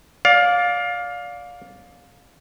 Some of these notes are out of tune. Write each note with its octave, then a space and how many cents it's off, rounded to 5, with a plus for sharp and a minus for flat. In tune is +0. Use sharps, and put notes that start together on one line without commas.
D5 -15 F5 +20